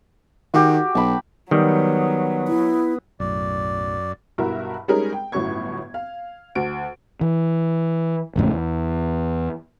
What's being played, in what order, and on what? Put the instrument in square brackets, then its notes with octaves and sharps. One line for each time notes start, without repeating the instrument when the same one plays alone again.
[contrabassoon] D#3 [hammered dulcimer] F#4 G4
[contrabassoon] B1 [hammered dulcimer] A5 B5
[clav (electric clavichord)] D#3 G3 [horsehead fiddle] F#3 [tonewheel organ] B3
[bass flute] E4
[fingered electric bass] B1 A2 [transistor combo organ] F#2 [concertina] D5
[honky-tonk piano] B1 G2 E4 F#4 A#4 E5
G3 G#3 C#4 D#4 G#4 A#4
G5
G1 A2 F#3 C#4 C#6 G#6
F5
D2 D7
[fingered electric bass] E3
G#1 F2 A2 C#3
E2